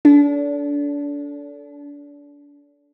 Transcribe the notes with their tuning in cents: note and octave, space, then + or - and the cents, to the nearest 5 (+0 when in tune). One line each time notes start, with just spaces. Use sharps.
D4 -30 A4 +0